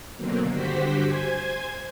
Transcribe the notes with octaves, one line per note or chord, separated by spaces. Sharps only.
B2 D3 D#3 F#3 A#3 C4
G2 D3 F#4 G4 C5 B6
C5 G#5 G#6